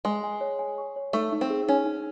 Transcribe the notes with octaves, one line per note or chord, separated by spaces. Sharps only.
G#3 G#5
G#5
C#5
G#5
C#6
C#5
A3 D#4
D#4
C4
G#4
C#4 D#4
D#4